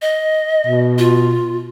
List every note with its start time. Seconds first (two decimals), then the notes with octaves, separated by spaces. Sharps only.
0.02 D#5
0.67 B2
0.98 F4